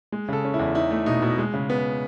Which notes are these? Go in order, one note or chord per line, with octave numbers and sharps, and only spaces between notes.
G#3
C#3 A4
C#4
E4
E2
D#4 E4
A3
B2 D#4
B2
G#3
C#3
B3